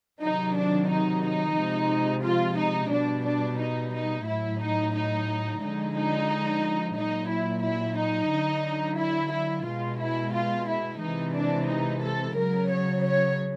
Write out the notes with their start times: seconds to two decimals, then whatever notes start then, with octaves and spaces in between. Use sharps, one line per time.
0.21 C3 D#3 F#3 D#4
0.54 D4
0.89 D#4
1.23 D#4
1.56 C3 F3 G#3
2.23 F4
2.57 D#4
2.91 B2 G3 D4
3.24 D4
3.58 D#4
3.92 D#4
4.25 A2 F#3 E4
4.59 D#4
4.93 D#4
5.61 D3 F3 G#3 D#4
5.94 D#4
6.96 A#2 F#3 D#4
7.29 E4
7.63 E4
7.96 D#4
8.30 D3 F#3
8.97 E4
9.31 E4
9.65 B2 G#3 F4
9.99 E4
10.32 F4
10.66 E4
11.00 C3 E3 G#3 D#4
11.33 D4
11.67 D#4
12.01 A4
12.35 C#3 F#3 A#4
12.69 C#5
13.01 C#5